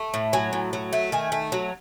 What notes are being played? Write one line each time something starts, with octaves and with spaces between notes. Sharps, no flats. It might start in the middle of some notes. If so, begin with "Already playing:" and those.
Already playing: A3
A2
F#3 G#5
A2
F#3
A3
D#3 G#5
A3
F#3